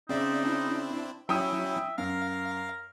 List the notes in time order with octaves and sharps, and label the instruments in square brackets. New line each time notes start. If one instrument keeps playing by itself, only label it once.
[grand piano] C#3 [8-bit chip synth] C4 D5 E5 [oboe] D#4
[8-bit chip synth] C4 D4 E4
[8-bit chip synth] F#3 C#4 E4 [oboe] E5 [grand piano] G5 D#6
[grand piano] F#2 [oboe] A#4 [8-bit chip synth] F5